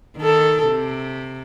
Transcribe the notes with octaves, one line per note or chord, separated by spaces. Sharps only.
D#3 A4
C3